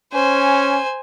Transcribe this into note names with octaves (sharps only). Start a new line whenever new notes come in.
C#4 C5 G#5